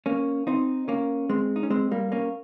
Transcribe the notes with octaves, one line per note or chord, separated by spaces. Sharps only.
A#3 C#4
C4 D#4
A#3 C#4
G#3 C4
D#4
C#4
G#3 C4
G3 A#3
A#3 C#4